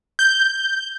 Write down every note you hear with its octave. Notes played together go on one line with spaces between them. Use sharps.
G6